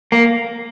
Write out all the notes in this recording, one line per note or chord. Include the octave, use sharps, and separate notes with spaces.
A#3